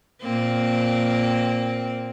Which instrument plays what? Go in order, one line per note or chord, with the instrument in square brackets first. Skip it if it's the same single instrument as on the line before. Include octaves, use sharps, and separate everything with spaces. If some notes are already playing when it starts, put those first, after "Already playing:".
[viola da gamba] A#2 A#3 C4